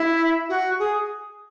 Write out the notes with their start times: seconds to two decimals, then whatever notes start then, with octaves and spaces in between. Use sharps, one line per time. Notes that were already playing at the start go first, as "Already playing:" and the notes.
Already playing: E4
0.49 F#4
0.79 G#4